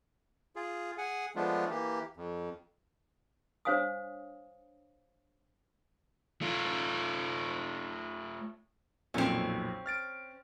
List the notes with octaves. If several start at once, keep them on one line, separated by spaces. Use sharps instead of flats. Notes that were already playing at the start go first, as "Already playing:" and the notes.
F4 G#4
G#4 F#5 G#5
F3 G#3 A3 B3 D4 F4
E3 A#3 G4
F2
D4 C5 C#5 F5 G#5 D#6
A3 F4
B1 F2 A#2 C4 C#4
F6 A6 D7